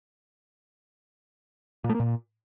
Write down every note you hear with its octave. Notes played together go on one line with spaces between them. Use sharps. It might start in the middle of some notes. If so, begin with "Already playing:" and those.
A#2
A3
A#3
A#2